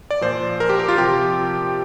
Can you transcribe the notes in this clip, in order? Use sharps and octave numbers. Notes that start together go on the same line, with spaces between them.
D5
A#2 F3 C5
A#4
G4
G4
F4
C3 F3 G4